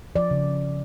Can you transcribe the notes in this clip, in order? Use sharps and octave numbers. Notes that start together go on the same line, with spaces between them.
F3 D5
C#3